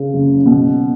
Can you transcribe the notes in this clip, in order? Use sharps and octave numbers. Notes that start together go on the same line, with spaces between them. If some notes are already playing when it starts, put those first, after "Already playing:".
Already playing: C#3
F#1
B2